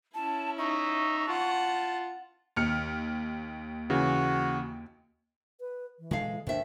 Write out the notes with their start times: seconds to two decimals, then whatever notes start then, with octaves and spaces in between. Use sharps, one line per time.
0.15 C#4 E4 A5
0.58 D#4 E5 C#6
1.28 F4 F#5 A5
2.56 D#2 F6 C#7
3.90 C#3 E3 F#4
5.60 B4
5.99 E3
6.11 A#2 D3 G#3 A4 F5
6.47 D#2 G#2 D4 C5 E5